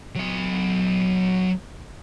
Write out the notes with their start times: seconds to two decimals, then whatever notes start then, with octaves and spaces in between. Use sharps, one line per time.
0.16 F#3 D#5